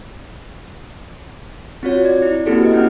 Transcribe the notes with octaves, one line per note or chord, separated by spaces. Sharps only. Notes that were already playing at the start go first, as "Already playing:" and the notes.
C4 F4 F#4 C#5
D5 G#6
E4
A#3 C4 E4 F#4 G4 A4
B4 D#5
B3 C#4 E4 F#5